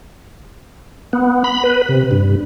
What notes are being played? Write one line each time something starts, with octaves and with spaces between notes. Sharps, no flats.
B3
B5
B4
C3
G2